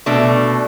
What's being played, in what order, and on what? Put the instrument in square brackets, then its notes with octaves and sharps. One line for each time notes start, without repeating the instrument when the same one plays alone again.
[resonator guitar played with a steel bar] B2 A3 D4